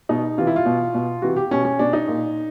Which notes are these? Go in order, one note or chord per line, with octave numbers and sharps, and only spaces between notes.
B2 D#4
C3 E3 F4
E4
F4
B2
B2
C3 E3 F#4
G4
B2 C#4
C#4
B2 D4
D#4
A#2